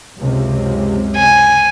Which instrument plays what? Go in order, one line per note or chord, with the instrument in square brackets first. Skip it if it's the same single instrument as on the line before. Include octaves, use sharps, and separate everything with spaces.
[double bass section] C#2 F#2 C3
[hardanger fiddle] G#5